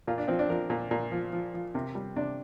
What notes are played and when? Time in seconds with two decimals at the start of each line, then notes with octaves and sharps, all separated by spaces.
0.07 A#2 F4
0.18 D4
0.28 F3 C4
0.39 D4
0.49 F3 A#4
0.70 A#2
0.91 A#2
1.12 F3
1.33 F3
1.54 F3
1.74 C3 A#4
1.95 G3
2.16 C3 D4